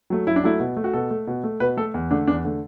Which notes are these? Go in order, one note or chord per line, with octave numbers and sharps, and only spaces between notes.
F#3 A3
F#2 E4
D4
F#3 A3 E4
B2
A3
F#4
B2 A4
A3
B2
A3
B2 B4
A3 A4
E2
D3 A3 D4
E2 D4
D3 A3